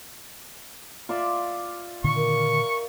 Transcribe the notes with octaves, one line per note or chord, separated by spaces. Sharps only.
F4 D5 E5
A#2 D3 D#3 C#6
A#4